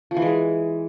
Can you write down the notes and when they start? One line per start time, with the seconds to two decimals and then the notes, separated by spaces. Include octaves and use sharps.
0.11 F3
0.17 E3
0.22 G#3